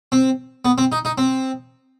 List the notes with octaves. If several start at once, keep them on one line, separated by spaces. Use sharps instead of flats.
C4
B3
C4
D#4
D#4
C4